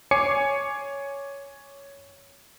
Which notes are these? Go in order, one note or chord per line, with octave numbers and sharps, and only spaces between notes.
C#5 G#5 D6 C7 C#7